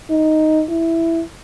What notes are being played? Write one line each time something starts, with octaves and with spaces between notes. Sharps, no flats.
D#4
E4